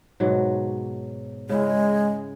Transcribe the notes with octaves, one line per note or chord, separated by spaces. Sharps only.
G#2 B2 F#3
C#3 G#3 E4